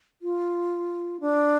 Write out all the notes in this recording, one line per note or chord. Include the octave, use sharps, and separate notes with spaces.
F4
D4